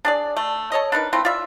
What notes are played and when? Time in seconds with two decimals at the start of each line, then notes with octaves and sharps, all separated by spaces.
0.05 D4 G#4 D5
0.37 A3
0.72 A4 C#5 D#5
0.92 D4 D#4 A#4 B4
1.13 A3 C4 E4 F4
1.25 F4 D5 E5